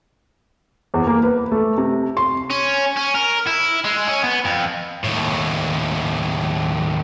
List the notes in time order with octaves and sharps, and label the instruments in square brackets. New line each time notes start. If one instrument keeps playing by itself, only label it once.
[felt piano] E2
A#3
B4
A3
C3
C6
[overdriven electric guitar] C#4
C#4
A#4
E4
G#3
C#4
B3
F2
D#2 A2